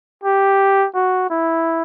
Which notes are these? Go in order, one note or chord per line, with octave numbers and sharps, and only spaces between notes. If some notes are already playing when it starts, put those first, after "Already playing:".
G4
F#4
E4